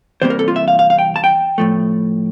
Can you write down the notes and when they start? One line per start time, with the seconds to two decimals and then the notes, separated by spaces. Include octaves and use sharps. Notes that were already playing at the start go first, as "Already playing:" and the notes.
0.22 E2 C3 G3 A#3 C5
0.30 A#4
0.39 A4
0.48 F4
0.56 E5
0.68 F5
0.79 F5
0.90 F5
0.99 G5
1.16 A5
1.24 G5
1.58 A2 F3 A3